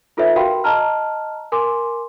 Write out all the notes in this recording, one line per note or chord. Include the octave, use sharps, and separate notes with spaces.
D#4 F4 A4 B4 C#5 E5
F#4 A#4 F5 G5 B5 C6
D#5 A5 A#5 F6
A#4 G#5 C6 D6